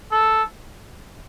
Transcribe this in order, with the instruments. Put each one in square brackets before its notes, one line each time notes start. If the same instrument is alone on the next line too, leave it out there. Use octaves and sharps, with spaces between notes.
[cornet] A4